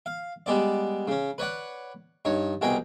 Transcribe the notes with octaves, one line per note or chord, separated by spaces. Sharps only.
F5
G3 G#3 B3 D5
C#3 C#4
B4 C#5 D5 F#5
G2 D#4 C#5
C2 B2 G#4 G5 G#5 A#5